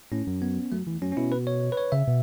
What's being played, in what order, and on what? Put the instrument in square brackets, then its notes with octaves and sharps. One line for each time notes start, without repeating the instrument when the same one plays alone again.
[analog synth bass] A2 [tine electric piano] C#4
[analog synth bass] F#2
[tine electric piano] B3
[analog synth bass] F#2 [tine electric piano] A3
[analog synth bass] E2
[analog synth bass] F#2 [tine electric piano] C#4
[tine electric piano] C#4
[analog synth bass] B2 [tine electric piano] E4
[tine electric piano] B4
C#5
B4
C#5
[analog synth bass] C#3 [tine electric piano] E5
[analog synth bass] B2